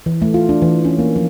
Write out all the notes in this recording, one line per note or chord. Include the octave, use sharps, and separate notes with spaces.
E3
A3
F4
D4
E3
C#4
A#3
F3